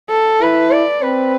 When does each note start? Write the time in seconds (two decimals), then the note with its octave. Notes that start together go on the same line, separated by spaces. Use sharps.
0.10 A4
0.41 E4 B4
0.71 D5
1.02 C4 B4